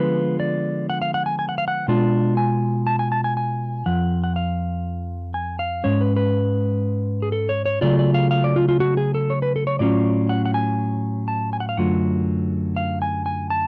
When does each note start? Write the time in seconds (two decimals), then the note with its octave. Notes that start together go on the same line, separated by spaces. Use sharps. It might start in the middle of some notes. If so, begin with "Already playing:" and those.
Already playing: D3 F3 G#3 B3 F4 B4
0.40 D5
0.90 F#5
1.02 F5
1.14 F#5
1.26 G#5
1.39 G#5
1.49 F#5
1.58 F5
1.68 F#5
1.88 B2 G#3 D4 F4
2.37 G#5
2.87 A5
2.99 G#5
3.12 A5
3.24 G#5
3.37 G#5
3.86 F2 F3 F#5
4.24 F#5
4.36 F5
5.34 G#5
5.59 F5
5.84 G#2 G#3 C#4 C#5
6.01 B4
6.16 B4
7.22 G#4
7.32 A4
7.49 C#5
7.66 C#5
7.81 C#3 F#3 A3 F4 D5
7.99 D5
8.14 F5
8.31 F5
8.44 D5
8.56 F4
8.69 F4
8.80 F#4
8.97 G#4
9.14 A4
9.30 C#5
9.42 B4
9.56 A4
9.67 C#5
9.79 A2 F#3 C#4 F4 D5
10.29 F#5
10.45 F#5
10.54 G#5
11.28 A5
11.53 G#5
11.60 F#5
11.69 F5
11.77 F#2 D3 F#3 A3 F4 F#5
12.76 F5
13.02 G#5
13.26 G#5
13.50 A5